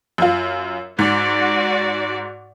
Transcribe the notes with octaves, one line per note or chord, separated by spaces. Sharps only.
F#2 F4
G#2 F#4 D5